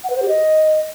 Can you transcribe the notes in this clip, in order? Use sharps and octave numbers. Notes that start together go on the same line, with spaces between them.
F#5
B4
C5
G4
D#5